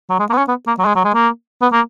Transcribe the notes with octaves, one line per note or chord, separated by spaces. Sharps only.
F#3
G#3
A#3
B3
C#4
B3
A#3
F#3
G#3
F#3
G#3
A#3
B3
A#3